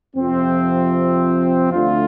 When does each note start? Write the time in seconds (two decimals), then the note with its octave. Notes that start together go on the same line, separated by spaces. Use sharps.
0.16 F2 C3 F3 C4
1.72 D2 D3 A3 D4 F4